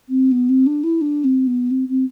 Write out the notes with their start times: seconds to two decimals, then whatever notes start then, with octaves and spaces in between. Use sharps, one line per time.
0.08 C4
0.31 B3
0.49 C4
0.66 D4
0.83 E4
1.01 D4
1.24 C4
1.46 B3
1.70 C4
1.88 C4